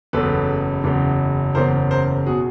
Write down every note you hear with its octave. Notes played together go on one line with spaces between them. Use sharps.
F#1 E2 C#3 A4 B4
F#1 E2 C#3
F#1 E2 C#3 A#4 C5
A#4 C5
B2 F#4 G#4